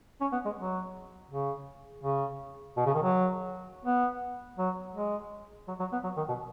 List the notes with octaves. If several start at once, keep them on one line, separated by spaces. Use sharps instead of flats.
C#4
B3
G#3
F#3
C#3
C#3
B2
C#3
D#3
F#3
B3
F#3
G#3
F#3
F#3
B3
F#3
D#3
B2